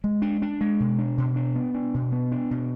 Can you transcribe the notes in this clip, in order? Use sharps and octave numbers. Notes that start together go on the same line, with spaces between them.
G#3
D4
D4
G#3
B2
D4
B2
D4
B3
D4
B2
B3
D4
B2